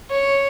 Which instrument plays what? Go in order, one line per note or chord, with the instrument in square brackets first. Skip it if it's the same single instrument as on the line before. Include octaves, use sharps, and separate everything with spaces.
[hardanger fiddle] C#5